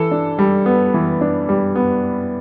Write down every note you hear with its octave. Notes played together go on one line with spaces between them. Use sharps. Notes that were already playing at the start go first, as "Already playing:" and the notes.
Already playing: E3 A4
D4
G3
B3
E3
D4
G3
B3